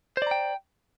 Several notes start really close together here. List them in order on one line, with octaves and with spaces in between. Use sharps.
C5 D5 A#5 G5